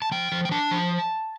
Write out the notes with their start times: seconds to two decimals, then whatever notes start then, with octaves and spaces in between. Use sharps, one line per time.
0.02 A5
0.12 F3 G5
0.32 F3
0.45 G5
0.51 D4 A5
0.71 F3